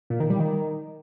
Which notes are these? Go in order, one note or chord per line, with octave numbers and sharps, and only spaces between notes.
A#2
D#3
G3
D#3